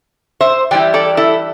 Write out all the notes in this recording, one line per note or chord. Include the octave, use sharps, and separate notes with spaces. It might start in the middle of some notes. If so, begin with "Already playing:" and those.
C5 E5
E3 G3 E4 D5 G5
A4 D5
E4 A4